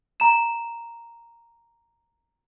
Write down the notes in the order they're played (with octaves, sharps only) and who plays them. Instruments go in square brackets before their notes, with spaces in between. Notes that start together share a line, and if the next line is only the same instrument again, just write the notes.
[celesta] A#5 E7